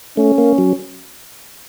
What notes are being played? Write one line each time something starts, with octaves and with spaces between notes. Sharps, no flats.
A3 C#4
A#3
F#3